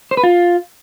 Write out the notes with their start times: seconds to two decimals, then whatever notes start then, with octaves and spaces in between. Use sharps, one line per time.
0.11 C5
0.17 B4
0.23 F4